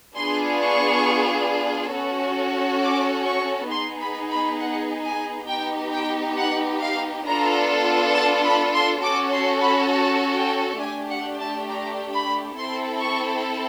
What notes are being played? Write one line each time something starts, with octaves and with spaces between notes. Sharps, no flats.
B3 D4 F4 G#4 C6
C#6
C#4 F#4 A4
D6
C#6
B3 D#4 G#4 C6
B5
B5
F#5
G#5
B3 D#4 G4 G5
G5
F#5
F5
B3 D4 F4 A4 A#5
A5
B5
C6
C#4 F#4 A4 D6
C6
B5
A5
G5
A3 D4 G4 G#5
F#5
A5
A#5
B5
C4 E4 A4 C6
C#6